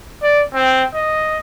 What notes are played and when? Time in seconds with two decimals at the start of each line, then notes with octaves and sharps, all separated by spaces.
0.22 D5
0.54 C4
0.94 D#5